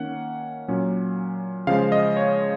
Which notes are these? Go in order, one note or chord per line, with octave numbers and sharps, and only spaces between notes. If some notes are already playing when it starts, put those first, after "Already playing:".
Already playing: D#3 A#3 C#4 F#5
A#2 F#3 C#4
C#3 F3 G#3 F5
D#5
C#5